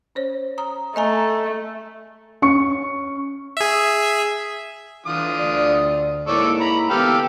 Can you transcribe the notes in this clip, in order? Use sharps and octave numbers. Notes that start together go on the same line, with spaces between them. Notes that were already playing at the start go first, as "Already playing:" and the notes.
C#4 C5 C#5
A#5 D#6
A3 D#5 G#5 A#5
C#4 C#6 C#7
G#4 E5
D3 E3 F4 D#6
D2 D5
G#2 A#3 E4 A4 C#5 D5
A#5 B5
D3 E3 B3 G4 A4 F5